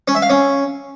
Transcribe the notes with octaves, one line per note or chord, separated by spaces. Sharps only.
C#4
E5
F5
C#4